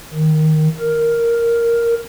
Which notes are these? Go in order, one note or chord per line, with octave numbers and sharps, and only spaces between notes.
D#3
A#4